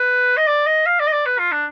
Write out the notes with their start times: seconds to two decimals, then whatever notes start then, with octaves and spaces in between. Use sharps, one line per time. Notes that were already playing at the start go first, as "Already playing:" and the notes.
Already playing: B4
0.37 D#5
0.47 D5
0.66 D#5
0.86 F5
1.00 D5
1.07 D#5
1.12 D5
1.26 B4
1.39 F4
1.52 D4